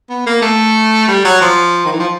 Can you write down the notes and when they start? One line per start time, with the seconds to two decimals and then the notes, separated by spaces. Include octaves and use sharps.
0.10 B3
0.26 A#3
0.42 A3
1.08 G3
1.24 F#3
1.41 F3
1.85 D#3
1.93 E3
2.00 F3